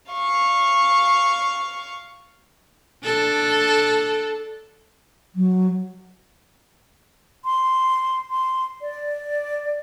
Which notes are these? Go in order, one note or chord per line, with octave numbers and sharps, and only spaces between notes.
F5 C#6
D4 A4
F#3
C6
C6
D5